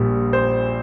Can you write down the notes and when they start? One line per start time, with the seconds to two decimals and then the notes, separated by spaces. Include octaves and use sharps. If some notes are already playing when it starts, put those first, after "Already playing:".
Already playing: A#1 A#2 G3
0.33 C5